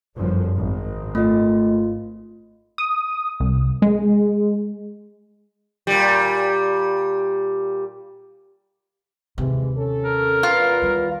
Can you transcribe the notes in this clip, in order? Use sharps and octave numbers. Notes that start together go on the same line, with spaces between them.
G1 F#2 F3
G#1
A3 F4 D#5
D#6
C2
G#3
A#2 G3
D#2 C3 E3 G#3
C#4 A4
A#4
E2 F4 B4
D#3 G3